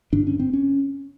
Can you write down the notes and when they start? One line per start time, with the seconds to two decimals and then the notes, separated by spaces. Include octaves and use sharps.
0.12 G2 D3 D4
0.27 C#4
0.40 C4
0.53 C#4